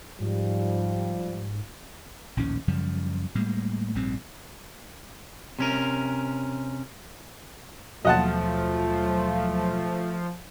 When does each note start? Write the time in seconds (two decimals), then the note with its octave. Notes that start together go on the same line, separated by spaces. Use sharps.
0.20 G#2 F3 G3
2.37 A#1 D#2 A2 C#4
2.68 F#2 C#3 F3 G3
3.35 A2 G3 G#3 A#3
3.95 A#1 G#2 G3 C4
5.59 C3 C#4 A#4
8.05 D#2 B2 F3 F#3 A3 D#5 F#5 A5